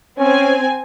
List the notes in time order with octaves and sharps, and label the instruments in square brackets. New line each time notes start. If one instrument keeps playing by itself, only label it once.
[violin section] C4 G#5 [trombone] C#4